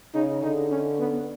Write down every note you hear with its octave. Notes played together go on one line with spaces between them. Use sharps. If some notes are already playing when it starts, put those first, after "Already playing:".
C#3 D#4
D3 D#4
C#4
B3